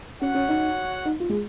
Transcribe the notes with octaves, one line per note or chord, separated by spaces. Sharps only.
C#4 F#4 C#5 F#5
C#4
D#4
D#4
F4
G#3